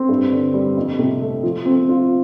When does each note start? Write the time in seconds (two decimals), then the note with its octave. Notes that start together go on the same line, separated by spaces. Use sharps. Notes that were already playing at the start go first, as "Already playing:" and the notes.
Already playing: C4
0.09 G2
0.32 D3
0.54 G3
0.77 F2
0.99 C3
1.22 A3
1.43 F3
1.66 C4
1.89 F4